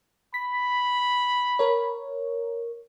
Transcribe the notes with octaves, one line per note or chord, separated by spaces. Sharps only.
B5 B6
A#4 C#5